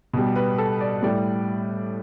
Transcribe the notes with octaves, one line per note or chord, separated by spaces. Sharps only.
B2 G3
B4
A4
D5
A2 G3 D5